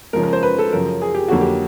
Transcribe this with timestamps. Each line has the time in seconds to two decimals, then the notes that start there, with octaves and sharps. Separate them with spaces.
0.13 C#3 F3 G#3 A#4
0.23 A#4
0.33 C5
0.43 B4
0.59 A4
0.73 F#2 C#3 F3 A#4
1.01 G#4
1.15 G4
1.28 F2 D3 F#3 A#3 F#4
1.41 G4